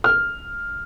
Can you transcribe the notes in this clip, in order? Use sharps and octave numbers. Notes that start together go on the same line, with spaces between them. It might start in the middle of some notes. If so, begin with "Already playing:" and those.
F6